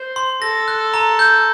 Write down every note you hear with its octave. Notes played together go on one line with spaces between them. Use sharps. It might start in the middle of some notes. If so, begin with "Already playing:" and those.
Already playing: C5
C6
A4 A#6
F#6
A#5
G6